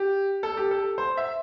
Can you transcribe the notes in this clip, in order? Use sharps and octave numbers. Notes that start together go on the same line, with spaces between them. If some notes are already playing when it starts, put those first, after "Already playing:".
Already playing: G4
A4
G4
A4
C5
E5